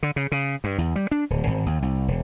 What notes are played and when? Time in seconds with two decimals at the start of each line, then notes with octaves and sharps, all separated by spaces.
0.03 D3
0.16 C#3
0.32 C#3
0.64 G2
0.78 E2
0.96 G3
1.11 D4
1.30 D1
1.47 G#1
1.66 D#2
1.82 C2
2.08 E1